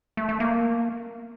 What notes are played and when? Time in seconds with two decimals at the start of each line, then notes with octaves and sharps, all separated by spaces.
0.17 A3
0.29 A3
0.40 A#3